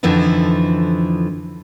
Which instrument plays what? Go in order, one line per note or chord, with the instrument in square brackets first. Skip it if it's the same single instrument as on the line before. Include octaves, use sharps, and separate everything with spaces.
[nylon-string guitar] F2 D3 E3 F3 D#4